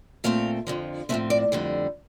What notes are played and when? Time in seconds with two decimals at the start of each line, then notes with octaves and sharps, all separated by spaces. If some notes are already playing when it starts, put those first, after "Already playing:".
0.24 A#2 A3 C4 F5
0.67 F2 D3 F3
1.09 A2 F3 A3 C4 E5
1.30 D5
1.52 F2 D3 G3